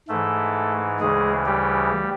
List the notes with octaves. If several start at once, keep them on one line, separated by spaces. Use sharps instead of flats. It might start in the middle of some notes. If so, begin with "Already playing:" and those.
G#2 E3 A3 A4
D2 C#3 E3 G#3 G#4
G3 G4